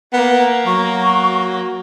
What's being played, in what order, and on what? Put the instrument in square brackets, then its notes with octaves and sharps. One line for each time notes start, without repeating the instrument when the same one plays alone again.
[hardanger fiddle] A#3 [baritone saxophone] B3
[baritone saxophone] F#3 [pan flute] C#6